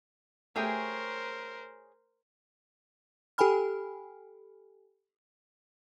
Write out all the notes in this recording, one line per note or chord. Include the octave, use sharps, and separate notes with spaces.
A3 G4 G#4 A#4 C5 C#5 G5
G4 A4 G5 G#5 B5 F6